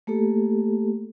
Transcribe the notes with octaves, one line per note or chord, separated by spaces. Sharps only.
A3 A#3 G4 A4